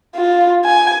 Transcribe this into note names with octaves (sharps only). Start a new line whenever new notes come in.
F4
G#5